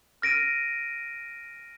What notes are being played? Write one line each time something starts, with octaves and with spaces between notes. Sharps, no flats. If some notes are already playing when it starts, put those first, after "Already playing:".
F6 A#6 D7 D#7